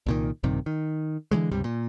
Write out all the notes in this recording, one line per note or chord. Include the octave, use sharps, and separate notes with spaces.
C2 A#2 D#3
A#1 G2 C3 D#3
D#3
D3 E3 F#3 G#3
C#2 G2 C3 G3
A#2